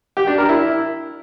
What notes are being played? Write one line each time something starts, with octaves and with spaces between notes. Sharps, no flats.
G4
D4
A#4
E4